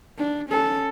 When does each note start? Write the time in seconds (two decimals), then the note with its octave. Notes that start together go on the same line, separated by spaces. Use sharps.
0.17 D4
0.49 C#4 A4